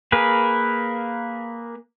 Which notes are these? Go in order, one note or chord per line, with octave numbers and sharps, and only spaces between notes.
A#3 G#4 A#4 B4